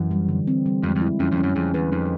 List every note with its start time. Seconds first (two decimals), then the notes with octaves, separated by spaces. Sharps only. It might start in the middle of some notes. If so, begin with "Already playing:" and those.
Already playing: F#2 E3
0.11 G3
0.29 D3
0.47 C4
0.66 G3
0.83 F2 G#3
0.96 F2
1.01 E4
1.20 F2 C#4
1.32 F2
1.38 C#4
1.43 F#2
1.55 F2 G#4
1.74 E2 B4
1.92 F2 D#4